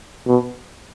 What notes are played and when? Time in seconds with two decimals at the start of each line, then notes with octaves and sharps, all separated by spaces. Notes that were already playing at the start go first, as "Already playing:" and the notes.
0.27 B2